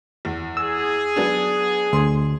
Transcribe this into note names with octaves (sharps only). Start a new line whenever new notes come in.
E2
G#4 E6
F#3 B3 D4
D2 C6